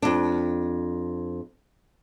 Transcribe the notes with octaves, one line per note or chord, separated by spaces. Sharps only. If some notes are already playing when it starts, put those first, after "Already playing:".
F2 D4